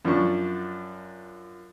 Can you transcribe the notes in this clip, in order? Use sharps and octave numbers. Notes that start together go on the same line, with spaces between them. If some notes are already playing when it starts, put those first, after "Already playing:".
F#2 F3 D4 C#6